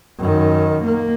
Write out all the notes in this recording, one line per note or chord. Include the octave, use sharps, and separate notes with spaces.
F#2 D#3
A#3